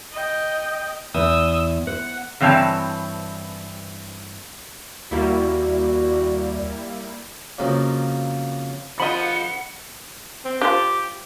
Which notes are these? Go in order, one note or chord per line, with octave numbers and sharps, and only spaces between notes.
D#5 G5
E2 D#6 E6
C5 F#5
G2 E3 C4 C#5 A5
D#2 G3 A#3 E4 F#4 D5
F2 C#3 F3 F#3 A#3
F3 D#5 F#5 B5 C#7
C4
D4 F4 G4 C5